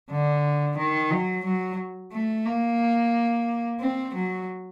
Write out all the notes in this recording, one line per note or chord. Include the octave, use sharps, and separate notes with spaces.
D3
D#3
F#3
F#3
A3
A#3
C4
F#3